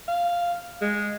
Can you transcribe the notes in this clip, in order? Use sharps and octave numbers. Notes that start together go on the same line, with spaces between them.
F5
G#3